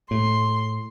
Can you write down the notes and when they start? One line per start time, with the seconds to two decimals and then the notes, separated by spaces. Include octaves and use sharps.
0.11 A2 C6